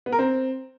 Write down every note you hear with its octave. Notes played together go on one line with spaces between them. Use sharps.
B3
A#4
C4